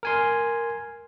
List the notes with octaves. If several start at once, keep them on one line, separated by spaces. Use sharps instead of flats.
A#4 G#5 C6